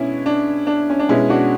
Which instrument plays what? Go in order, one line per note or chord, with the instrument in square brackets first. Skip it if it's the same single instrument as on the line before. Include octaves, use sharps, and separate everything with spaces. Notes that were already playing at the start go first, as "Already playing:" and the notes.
Already playing: [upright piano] B2 G#3 C#4 D4 E4
D4
D4
C#4
D4
B2 G#3 C#4 E4
D4 F#4